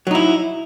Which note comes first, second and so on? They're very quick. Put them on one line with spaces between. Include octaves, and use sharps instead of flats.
F#3 D#4 E4